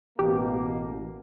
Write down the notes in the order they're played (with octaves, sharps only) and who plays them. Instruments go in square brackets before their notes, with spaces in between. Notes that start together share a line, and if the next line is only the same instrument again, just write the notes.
[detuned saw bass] A1 [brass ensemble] B2 A#3 [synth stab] G4